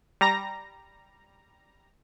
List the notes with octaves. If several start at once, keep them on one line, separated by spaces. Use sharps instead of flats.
G3 A#5 A#6